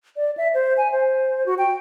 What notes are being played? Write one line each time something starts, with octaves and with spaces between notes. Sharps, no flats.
D5
E5
C5
G#5
C5
F#4
G5